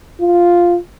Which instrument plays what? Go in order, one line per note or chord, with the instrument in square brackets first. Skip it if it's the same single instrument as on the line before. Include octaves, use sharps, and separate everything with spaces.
[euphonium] F4